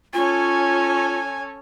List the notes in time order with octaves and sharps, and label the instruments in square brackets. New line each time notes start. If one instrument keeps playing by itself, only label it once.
[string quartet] C#4 A4 C#5 [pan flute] F4 [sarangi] G#5